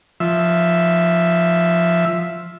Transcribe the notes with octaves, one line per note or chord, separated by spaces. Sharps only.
F3 E5